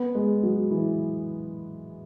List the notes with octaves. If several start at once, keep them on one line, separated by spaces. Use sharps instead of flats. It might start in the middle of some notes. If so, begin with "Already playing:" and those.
Already playing: B3
G#3
F#3
E3